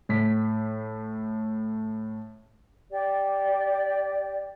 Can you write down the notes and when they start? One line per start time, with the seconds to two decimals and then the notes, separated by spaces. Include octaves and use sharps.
0.09 A2 B6
2.91 G4 D5